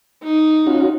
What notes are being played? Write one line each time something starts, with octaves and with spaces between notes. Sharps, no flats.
D#4
C#4 F4 F#4